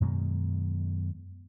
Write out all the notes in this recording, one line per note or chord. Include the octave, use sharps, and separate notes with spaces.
F#2 B2 D#3 G#3